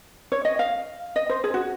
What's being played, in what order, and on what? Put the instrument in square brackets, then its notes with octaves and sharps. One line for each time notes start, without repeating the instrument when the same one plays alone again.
[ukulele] C#5
D#5
F5
D#5
C5
G#4
F#4